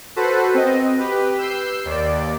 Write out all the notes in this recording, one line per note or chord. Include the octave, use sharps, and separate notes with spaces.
F#4 A4 B4 C5
C4 D#5
G4 B4
E6 G6 C7
D#2 D5